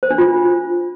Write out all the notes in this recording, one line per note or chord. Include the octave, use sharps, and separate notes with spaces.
C5
D4
F4